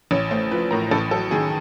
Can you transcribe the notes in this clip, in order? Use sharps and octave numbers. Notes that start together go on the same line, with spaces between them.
A1 C#5
A3 C5
F3 B4
A2 A#4
A1 A4
F#3 A4
D#3 G#4